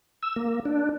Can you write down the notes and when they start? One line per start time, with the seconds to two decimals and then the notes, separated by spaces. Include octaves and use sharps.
0.23 E6
0.36 A#3
0.65 D4